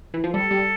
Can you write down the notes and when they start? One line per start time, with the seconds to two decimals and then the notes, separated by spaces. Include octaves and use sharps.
0.14 E3
0.24 F3
0.34 G3 A4
0.51 G3